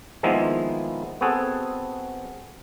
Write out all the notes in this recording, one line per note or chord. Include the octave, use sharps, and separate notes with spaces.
D#3 F3 G#3 A#3 B3 E4
B3 C4 F#4 G#4 A4